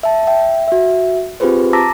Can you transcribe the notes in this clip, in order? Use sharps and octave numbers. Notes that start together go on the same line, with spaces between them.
E5 A5
E5 G5
F#4 E5
C4 F4 G4 G#4 B4 C5
A5 A#5 D6 E6 A#6 B6